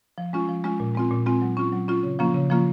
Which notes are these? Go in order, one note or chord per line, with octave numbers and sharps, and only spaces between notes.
F3
G#3 C#4 F4
F3
G#3 C#4 F4
A#2
G#3 C4 F4
A#2
G#3 C4 F4
F#3
C#4 F4
F#3
C#4 F4
C#3
F3 A#3 C#4 F4
C#3
F3 A#3 C#4 F4